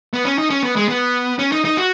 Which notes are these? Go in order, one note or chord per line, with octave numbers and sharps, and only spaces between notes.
B3
C#4
D#4
C#4
B3
G#3
B3
C#4
D#4
D#4
F#4